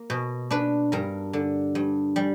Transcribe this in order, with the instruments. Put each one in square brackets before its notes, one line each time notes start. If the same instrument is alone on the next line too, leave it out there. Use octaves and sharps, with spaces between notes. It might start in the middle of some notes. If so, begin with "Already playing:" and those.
Already playing: [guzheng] A#3
B2
D4 B4
G2 A#4
D3
G2
G3